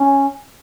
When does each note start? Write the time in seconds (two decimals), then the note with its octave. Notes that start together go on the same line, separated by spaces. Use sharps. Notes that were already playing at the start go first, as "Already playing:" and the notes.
Already playing: C#4